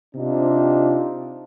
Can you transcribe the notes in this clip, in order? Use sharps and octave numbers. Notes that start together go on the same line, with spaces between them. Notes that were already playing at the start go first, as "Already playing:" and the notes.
C3 D4 D#4 F4